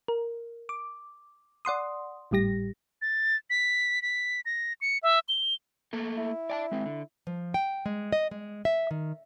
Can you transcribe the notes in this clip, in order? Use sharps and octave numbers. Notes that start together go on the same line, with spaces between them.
A#4
D6
D5 F#5 C6 D#6
G#1 A2 G3 G4 A#6
A6
B6
B6
A#6
C#7
E5
G7
A3 A#3 A4
E4
D5 G#5 A5
G#3 C4
D3
F3
G5
G#3
D#5
G#3
E5
D#3